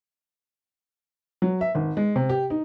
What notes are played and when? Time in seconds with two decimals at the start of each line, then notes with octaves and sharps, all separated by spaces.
1.42 F#3
1.61 E5
1.75 G#1
1.97 G#3
2.16 C3
2.29 G4
2.50 D#4